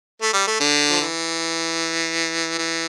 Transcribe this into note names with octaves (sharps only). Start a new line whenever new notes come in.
A3
G3
A3
D3
F3
E3
E3